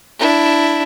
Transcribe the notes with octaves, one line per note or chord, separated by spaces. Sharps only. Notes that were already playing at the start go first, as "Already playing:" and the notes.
D4 E4